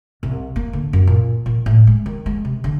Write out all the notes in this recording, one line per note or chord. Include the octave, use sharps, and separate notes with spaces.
C2
A#3
D3
F#2
A#2
A#2
A2
G#3
D#3
G#3
C3
D3